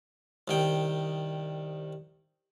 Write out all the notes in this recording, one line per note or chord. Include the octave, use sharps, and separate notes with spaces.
C2 D#3 G5